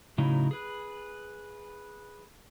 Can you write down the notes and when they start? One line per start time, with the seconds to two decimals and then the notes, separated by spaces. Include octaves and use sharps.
0.18 A2 C#3 F#3 D#4 E4
0.51 G#4 B4